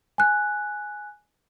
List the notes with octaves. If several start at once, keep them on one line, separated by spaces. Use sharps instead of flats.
G#5 F#6